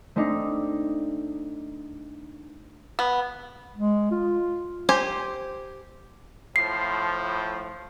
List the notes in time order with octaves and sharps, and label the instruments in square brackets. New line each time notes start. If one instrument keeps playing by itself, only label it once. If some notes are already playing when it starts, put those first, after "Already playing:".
[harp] A3 C4 D4 D#4
[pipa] B3
[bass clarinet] G#3
F4
[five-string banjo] G4 C5 G#5
[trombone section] A2 F3 [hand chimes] C7